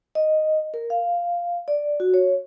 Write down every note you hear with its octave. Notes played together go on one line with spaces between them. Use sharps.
D#5
A#4
F5
D5
F#4
C#5